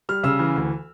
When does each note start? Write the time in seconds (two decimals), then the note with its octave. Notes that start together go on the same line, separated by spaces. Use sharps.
0.09 G3 F6
0.23 C#3 E6
0.39 E3
0.56 D2